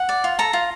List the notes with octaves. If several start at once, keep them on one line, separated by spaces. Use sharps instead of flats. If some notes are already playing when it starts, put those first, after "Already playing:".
Already playing: F#5
D5
F4
A4 A#5
F4